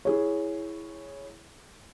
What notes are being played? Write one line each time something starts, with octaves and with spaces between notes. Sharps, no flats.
E4 G#4 C#5